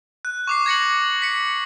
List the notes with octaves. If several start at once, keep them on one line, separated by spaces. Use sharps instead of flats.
F#6
C#6 D6 C7
G#6 A#6 C#7 F#7
B6 C#7